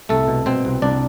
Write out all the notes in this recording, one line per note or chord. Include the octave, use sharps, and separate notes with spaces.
C2 A3 A4
B2
B2 C4 C5
C2
C2 D4 D5